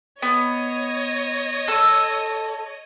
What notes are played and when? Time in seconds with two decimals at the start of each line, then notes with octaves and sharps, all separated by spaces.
0.22 B3 C#5 D#5
1.68 A4 E6